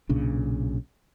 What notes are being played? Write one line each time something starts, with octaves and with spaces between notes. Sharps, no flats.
B1 A#2 C#3 D4